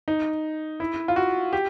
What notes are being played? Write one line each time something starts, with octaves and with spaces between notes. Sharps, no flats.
D#4
E4
F4
F#4
G4